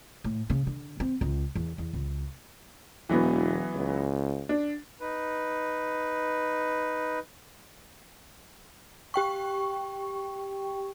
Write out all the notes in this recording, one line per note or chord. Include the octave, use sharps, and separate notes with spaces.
A2
C#3
D3
C4
C#2
E2
E2
C#2
E1 E3 F#3 B3
C#2
D4
D#4 B4
G4 G5 C#6